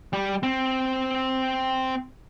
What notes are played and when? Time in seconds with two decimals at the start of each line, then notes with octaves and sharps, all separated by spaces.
0.13 G3
0.43 C4